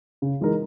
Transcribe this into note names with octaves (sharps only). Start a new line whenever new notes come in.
C#3
E3 G#3 D#4 A#4